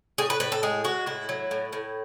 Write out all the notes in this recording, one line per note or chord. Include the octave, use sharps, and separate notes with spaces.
A2 G#4
B4
A2 B4
A4
G#3 G#4
G#3 F#4
A2 E4
F#3
A2
A2